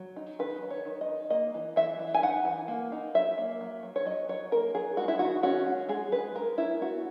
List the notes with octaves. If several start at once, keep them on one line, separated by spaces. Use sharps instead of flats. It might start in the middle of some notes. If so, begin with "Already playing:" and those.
Already playing: F#3
D#4
D#3 B4
F#3
C#5
D#3
D#5
D#3
A#3 D#5
E3
E3 E5
E3
G#5
D#4 F#5
E3
A#3
D#4
F#3 E5
A#3
F#3
F#3
C#5
F#3 D#5
F#3 C#5
A#3 A#4
F#3 G#4
G#3 F#4
E4
D#3 F#4
C#4 F#4
G#3
G#3 G#4
G#3 B4
G#3 A#4
C#4 E4
B3 F#4